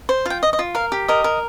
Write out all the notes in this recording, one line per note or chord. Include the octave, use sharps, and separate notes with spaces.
C5
F4 G5
D#5
D#5
F4
A#4 F5
G4
A#4 D#5
A#4